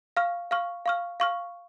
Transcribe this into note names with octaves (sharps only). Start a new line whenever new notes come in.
F5 C#6 F6
F5 C#6 F6
F5 C#6 F6
F5 C#6 F6